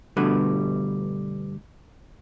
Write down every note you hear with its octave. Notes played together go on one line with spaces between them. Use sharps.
G2 B2 D3 G3 A3 B4